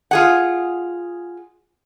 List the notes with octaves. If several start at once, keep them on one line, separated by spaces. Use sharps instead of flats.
F4 G#4 F#5